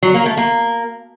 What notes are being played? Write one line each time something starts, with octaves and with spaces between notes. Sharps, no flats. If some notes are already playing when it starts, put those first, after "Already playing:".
F#3
A#3
A3
A#3